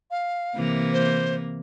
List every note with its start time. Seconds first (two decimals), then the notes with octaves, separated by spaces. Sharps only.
0.11 F5
0.55 C3 E3 A#3
0.93 C5